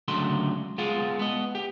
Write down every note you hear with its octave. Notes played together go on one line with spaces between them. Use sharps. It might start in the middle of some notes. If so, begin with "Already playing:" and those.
C#2 D3 F#3 A3 F#4 C6
G#3 B3 F4
B3 D#5
G4